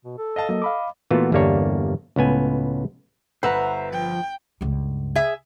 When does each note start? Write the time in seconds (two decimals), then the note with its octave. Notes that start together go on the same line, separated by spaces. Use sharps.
0.05 B2
0.18 A4
0.36 D#5 F5 A5
0.49 F#3 A#3 D#5
0.62 F5 B5 D6
1.11 A#2 E3 A3 B3 F4 F#4
1.32 G1 E2 G3 A#3 D4 C#5
2.16 C#2 A2 B3 G#5
3.43 G1 B4 C5 E5 F#5 A#5 B6
3.92 F3 G5
4.61 C#2 G2
5.15 G#4 E5